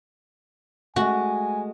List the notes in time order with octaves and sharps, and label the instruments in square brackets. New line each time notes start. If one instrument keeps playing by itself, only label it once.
[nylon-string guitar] G#3 A3 [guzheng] F#4 [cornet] G#5